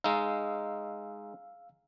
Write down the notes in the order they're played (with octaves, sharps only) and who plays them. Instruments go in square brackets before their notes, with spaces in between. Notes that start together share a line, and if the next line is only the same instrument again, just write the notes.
[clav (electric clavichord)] G#3 D#4 [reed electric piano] F5 E6